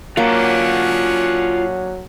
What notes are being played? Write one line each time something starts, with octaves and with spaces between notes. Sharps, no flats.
F#3 A#3 C#4 D4 F4 C#5 F#5